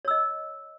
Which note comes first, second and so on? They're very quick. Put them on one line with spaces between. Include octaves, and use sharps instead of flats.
C#5 E6 D#5